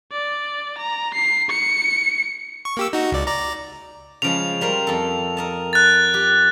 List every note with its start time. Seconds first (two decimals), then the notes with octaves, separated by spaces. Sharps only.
0.11 D5
0.78 A#5
1.14 C7
1.50 C#7
2.65 C#6
2.77 A#3 G4 E6
2.93 D#4 F#4
3.12 C#2 D5
3.27 D5 A#5
4.22 C#3 F3 G#3 F7
4.61 G3 A#4 C5
4.87 F2 A4
5.37 A#4 D#5 A5
5.73 F#6 A6
6.14 G4